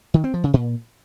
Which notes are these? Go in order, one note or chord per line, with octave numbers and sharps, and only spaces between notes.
D#3
C4
F3
C#3
A#2